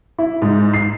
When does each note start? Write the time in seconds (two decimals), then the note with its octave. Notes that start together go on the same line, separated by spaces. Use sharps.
0.18 E4
0.42 G#2
0.74 C7